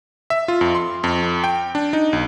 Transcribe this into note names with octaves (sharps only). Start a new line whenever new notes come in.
E5
F4
F2
C6
F2
G5
D4
D#4
B1